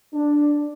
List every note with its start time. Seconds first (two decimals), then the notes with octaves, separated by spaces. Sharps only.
0.13 D4